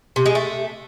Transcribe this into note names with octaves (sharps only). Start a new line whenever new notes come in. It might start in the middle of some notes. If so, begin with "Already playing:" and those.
C3
G#3
A3